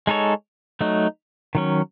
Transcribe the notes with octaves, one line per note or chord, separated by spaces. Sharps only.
G#3 D#4 A4 C#5
F#3 A3 D#4
D#3 F#3 C#4